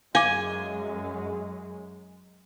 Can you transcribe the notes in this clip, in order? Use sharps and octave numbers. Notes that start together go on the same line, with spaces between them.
F#2 G#3 F5 G#5 D6